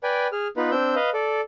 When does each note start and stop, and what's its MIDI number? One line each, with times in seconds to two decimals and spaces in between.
0.03 0.27 71
0.03 0.27 74
0.03 0.27 79
0.03 0.27 80
0.32 0.48 68
0.32 0.48 89
0.57 0.71 59
0.57 0.71 63
0.57 0.71 65
0.57 0.71 71
0.71 0.95 60
0.71 0.95 62
0.71 0.95 88
0.71 0.95 91
0.96 1.10 71
0.96 1.10 75
0.96 1.10 77
1.14 1.41 69
1.14 1.41 74